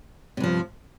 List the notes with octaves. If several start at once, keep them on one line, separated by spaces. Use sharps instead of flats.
G2 C3 F3